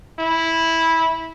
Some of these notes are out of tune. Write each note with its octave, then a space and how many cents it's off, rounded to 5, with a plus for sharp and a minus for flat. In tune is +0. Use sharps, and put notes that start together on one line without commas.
E4 -10